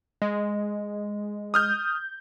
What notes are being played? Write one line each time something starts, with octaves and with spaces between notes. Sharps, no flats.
G#3
D#6 F6 G6